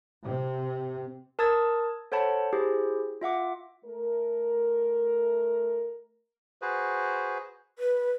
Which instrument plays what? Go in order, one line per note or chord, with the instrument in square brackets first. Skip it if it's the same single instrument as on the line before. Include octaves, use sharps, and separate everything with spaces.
[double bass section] C3
[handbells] A#4 A5 D#6 E6 G#6 A6
A4 C5 C#5 F#5 A5 B5
E4 G4 G#4 C5
F4 E5 F#5 D6
[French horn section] A3 A#4
[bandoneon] F#4 G#4 B4 C5
[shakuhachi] B4